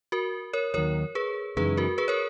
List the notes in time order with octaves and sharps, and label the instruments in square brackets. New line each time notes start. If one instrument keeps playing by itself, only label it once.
[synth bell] F#4 A#4
A#4 C#5
[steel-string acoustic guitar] D#2 D#3 F#3 [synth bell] A#4 C#5
[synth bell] G#4 B4
[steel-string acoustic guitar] F#2 C#3 E3 G#3 D#4 [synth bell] G#4 B4
[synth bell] F#4 A#4
G#4 B4
A#4 C#5